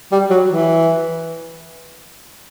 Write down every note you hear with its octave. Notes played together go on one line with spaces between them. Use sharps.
G3
F#3
E3